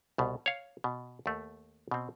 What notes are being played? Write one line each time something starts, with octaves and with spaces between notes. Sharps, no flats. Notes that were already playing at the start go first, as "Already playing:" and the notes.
C2 B2
C#5 F5
B2
D#2 A3
B2 C4